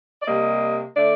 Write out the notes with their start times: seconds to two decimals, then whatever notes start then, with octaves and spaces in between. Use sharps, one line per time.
0.22 D5
0.27 C3 G3 A#3 D#5
0.95 D3 A3 D5